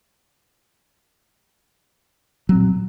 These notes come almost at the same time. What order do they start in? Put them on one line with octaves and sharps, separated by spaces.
F#3 C4 A#2